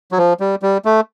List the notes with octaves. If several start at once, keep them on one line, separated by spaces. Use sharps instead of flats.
F#3
F3
G3
G3
A3